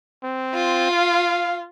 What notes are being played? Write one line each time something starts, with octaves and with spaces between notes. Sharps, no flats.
C4
F4
F5